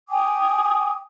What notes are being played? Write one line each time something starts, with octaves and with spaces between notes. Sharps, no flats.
G5 G#5 D6 D#6